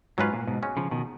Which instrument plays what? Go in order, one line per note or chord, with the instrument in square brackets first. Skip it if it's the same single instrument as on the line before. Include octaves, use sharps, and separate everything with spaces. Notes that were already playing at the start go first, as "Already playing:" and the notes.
[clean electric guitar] G#2 [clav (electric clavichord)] F#3 C#4 F4 B4
[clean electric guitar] A#2
G#2 B2
[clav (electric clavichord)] G#3 C#4 F#4
[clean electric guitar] C#3 F3
B2 D#3